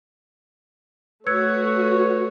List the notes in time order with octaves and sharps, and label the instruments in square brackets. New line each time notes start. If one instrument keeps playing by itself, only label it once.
[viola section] A3 F#4 [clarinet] B4 [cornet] C#5 [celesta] E6 G#6 C#7